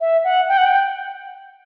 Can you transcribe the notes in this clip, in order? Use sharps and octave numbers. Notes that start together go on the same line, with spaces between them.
E5
F#5
G5
F#5
G5